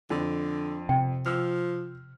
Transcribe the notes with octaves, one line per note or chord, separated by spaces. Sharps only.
F2 D3
C3 G5
F3 E6 F6